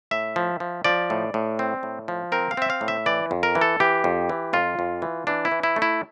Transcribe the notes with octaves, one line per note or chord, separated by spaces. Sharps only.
A2 E5
F3
F3
F3 D5
A2
A2
C4
A2
F3
C4 A#4
F5
C4 E5
F5
A2
E5
E3 D5
F2
A#4
E3
A4
E3 G4
F2
E3
F2 F4
F2
E3
E3 D4
E4
E3
E4
A3
E4